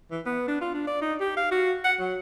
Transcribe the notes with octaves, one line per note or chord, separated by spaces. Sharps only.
E3
B3
D4
F4
D4
D5
D#4
G4
F5
F#4
F#5
F#3